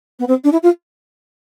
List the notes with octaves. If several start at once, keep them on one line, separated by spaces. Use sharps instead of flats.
B3
C4
D4
E4
F4